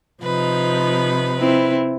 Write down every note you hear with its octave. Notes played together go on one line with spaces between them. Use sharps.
C3 F3 D#4 B4
C4 E4